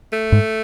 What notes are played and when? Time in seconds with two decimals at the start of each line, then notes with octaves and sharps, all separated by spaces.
0.13 A3
0.32 G#2